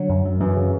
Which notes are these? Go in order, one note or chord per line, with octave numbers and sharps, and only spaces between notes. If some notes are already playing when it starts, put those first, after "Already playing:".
Already playing: D3 F#3
F#2
F#2
F#2 E3
C#3